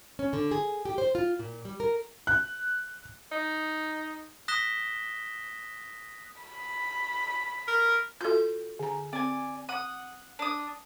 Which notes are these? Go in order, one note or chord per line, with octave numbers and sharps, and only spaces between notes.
C#4
D3
G#4
G4
C5
F4
A#2
G3
A#4
F#6
D#4
D#6 F#6 A#6 B6 E7 G7
B5
A#4
F4 F#4 A4 G6
D3 A#5
C4 D5 G#5
F#5 D#6
D4 D#6